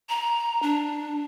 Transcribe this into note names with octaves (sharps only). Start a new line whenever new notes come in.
A#5
D4